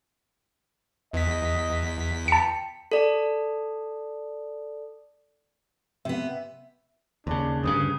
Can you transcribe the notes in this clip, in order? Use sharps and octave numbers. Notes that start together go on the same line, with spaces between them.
E2 D#5 B6
G5 A5 C#7
A4 D5
C3 B3 E5
D#2 C#3 D4
D2 G2 C#3 D#6